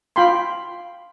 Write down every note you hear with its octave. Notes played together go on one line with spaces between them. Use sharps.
F4 F5 G5 B5 C6